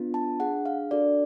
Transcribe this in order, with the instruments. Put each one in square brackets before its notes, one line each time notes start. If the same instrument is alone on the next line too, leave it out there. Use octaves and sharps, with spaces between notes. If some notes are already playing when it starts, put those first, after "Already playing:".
Already playing: [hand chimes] B3 D4 F4
A5
D4 G#4 F#5
F5
D4 F#4 A4 D5